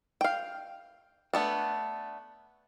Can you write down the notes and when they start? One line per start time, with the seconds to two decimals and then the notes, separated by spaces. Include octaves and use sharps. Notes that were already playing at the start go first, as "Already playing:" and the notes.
0.21 F5 G5
1.33 A3 B3 D4